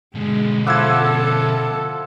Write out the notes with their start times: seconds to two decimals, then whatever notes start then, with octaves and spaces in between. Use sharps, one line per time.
0.15 B2 D3 G#3
0.67 F3 E4 A4 F#5 D6 E6 G#6